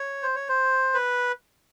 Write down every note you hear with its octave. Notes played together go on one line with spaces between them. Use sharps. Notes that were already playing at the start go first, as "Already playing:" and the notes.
Already playing: C#5
C5
C#5
C5
B4